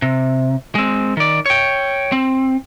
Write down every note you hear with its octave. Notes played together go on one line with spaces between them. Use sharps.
C3
G#3 C4
D#3 D5
C#5 G5
C4